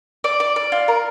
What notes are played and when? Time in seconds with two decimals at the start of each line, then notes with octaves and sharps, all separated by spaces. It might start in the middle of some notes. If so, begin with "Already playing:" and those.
0.24 D5
0.40 D5
0.56 D5
0.72 F4
0.88 A#4